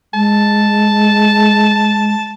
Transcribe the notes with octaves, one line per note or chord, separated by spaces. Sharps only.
G#3 A5